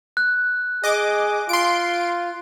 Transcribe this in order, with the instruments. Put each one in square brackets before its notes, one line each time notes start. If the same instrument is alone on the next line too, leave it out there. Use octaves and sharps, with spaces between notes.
[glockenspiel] F#6
[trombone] G#4 [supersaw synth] D#5 D6
[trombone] F4 [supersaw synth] C6 D7